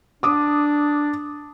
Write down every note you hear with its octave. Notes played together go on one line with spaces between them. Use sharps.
D4 D6 D#6